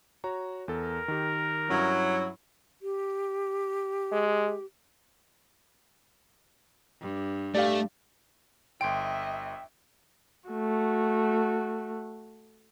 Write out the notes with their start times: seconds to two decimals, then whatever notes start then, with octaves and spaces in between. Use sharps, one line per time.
0.24 F#4 C#5 A#5
0.68 E2 A4 A#4
1.08 D#3 G4
1.70 G2 F#3 C#4 E4
2.82 G4
4.12 G#3
7.01 G2
7.55 A3 G4 D5 F5
8.81 G1 D#5 E5 G5 C6 D7
10.49 A3 F#4